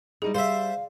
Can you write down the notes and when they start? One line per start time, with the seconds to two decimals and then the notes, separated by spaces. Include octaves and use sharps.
0.22 G3 D#4 E4 G#4
0.35 G3 C5 E5 F5